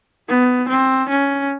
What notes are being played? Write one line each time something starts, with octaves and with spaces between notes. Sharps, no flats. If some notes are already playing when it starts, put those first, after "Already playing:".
B3
C4
C#4